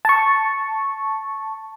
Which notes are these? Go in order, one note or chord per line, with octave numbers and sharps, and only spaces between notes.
A5 C#6